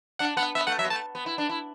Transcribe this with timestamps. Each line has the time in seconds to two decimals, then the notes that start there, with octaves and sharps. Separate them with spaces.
0.19 D4 F#5
0.37 B3 F#5
0.55 B3 E5
0.67 A3 F#5
0.79 F#3 E5
0.85 B3
0.90 A3 A5
1.15 B3
1.26 E4
1.38 D4
1.49 E4